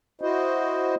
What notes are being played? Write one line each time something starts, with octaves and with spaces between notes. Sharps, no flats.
E4 F#4 C5 D#5